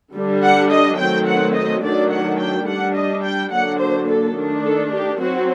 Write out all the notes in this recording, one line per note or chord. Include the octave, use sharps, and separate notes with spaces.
D3 G3 D4
F#5
D#5
D#3 F#3 A3 C4 G5
F#5
D#5
D#3 F#3 A3 D4 D5
F#5
G5
G3 D4 F#5
D#5
G5
D3 F#3 A#3 D4 F#5
C5
A4
D#3 A3 D4
A4
G4
F#3 C4 F#4